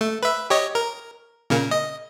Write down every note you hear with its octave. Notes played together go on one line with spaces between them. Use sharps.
A3
B4 E5
G4 C#5 D#5
A#4
A#2 C#3 A#3
D#5